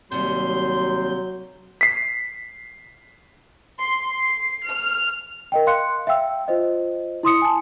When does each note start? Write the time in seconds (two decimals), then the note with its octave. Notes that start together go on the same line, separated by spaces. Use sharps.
0.12 D#2 C3 F#3 G3 C6 G6
1.81 B6 C7
3.79 C6
4.20 C7
4.70 F6
5.52 A#4 D#5 G5
5.67 F5 C6 F#6 C#7
6.07 E5 F5 G5 E6
6.48 F4 C5 D#5
7.23 E4 C6 D#6 C#7
7.42 G#5 A5